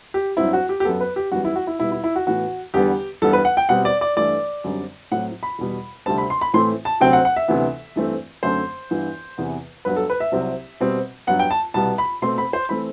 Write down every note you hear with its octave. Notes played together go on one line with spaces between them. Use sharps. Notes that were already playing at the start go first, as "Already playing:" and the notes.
G4
G2 F#3 C4 E4
F#4
G4
G4
F#2 F#3 B3 A4
B4
G4
F#2 E3 G3 B3 F#4
E4
F#4
E4
B2 G3 B3 E4
E4
E4
F#4
A2 E3 B3 F#4
E2 D3 G3 B3 G4
G2 E3 G3 B3 A4
B4
F#5
G5
B2 G3 C4 F#5
D5
D5
G2 E3 A3 D5
F#2 D3 G3 C4
A2 F#3 C4 F#5
B5
E2 B2 G3
D2 C3 G3 C4 A5
B5
C6
B5
A2 E3 A3 C4 C6
A5
D2 C3 F#3 C4 G5
F#5
F#5
E5
D2 C3 E3 B3
G2 E3 A3 C4
F#2 D3 A3 C4 C5
G2 E3 B3
E2 C3 E3 B3
G2 F#3 B3 B4
A4
B4
E5
C2 C3 F#3 C4
B2 G3 C4
G2 F#3 B3 F#5
G5
A5
C2 B2 G3 B3 A5
B5
B2 A3 C4 C6
B5
C5
E3 A3 C4 B5